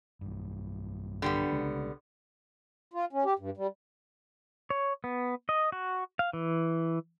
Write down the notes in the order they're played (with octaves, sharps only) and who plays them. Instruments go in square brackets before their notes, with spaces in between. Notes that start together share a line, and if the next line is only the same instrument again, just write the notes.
[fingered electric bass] B1 G2
[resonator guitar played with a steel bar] D3 G3 B3
[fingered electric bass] B1 C#3 G#3
[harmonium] F4
C#4
G4
G2
G3
[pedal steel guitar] C#5
B3
D#5
F#4
F5
E3